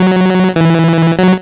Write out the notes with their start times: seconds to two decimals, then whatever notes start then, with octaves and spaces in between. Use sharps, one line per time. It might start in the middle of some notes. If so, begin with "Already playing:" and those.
Already playing: F#3
0.56 E3
1.19 F#3